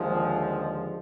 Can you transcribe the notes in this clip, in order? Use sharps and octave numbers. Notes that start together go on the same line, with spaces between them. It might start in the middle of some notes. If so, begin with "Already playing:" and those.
Already playing: D#2 D3 F3 G#3 G#4